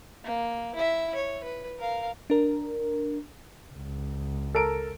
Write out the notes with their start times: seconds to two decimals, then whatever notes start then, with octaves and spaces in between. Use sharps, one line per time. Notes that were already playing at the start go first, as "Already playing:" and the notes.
0.24 A#3
0.75 E4 E5
1.15 C#5
1.44 B4
1.79 A#4 F5
2.30 D4 A#4
3.72 C#2
4.55 A4 A#4 D7